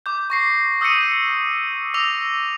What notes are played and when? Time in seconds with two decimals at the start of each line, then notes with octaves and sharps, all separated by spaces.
0.06 D6 G6
0.30 C#6 A#6 C7
0.81 D#6 E6 G6 A#6 C#7 D#7
1.94 D6 E6 A#6 F7